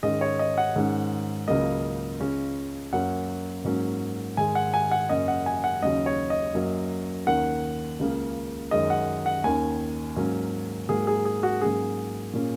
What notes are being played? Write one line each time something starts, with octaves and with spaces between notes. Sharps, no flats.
G#2 D#3 G#3 C#4 D#5
C#5
D#5
F#5
G#2 D#3 G#3 C#4
C#2 C#3 F#3 A#3 D#5
C#2 C#3 G#3 C#4
F#2 F#3 A#3 C#4 F#5
G#2 F#3 A#3 C#4
G#2 D#3 G#3 G#5
F#5
G#5
F#5
F#2 C#3 A#3 C#4 D#5
F#5
G#5
F#5
D#2 C#3 F#3 C#4 D#5
C#5
D#5
F#2 F#3 A#3 C#4
D#2 D#3 A#3 C#4 F#5
C#2 C#3 A#3
F#2 D#3 G#3 C#4 D#5
F#5
F#5
D#2 D#3 A#3 C#4 G#5
G#2 F#3 A#3 C#4
G#2 F#3 A#3 G#4
G#4
G#4
F#4
G#2 F#3 A#3 C#4 G#4
A#2 A#3 C#4